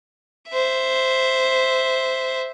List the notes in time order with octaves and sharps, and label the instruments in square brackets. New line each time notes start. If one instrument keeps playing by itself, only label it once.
[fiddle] C5 E5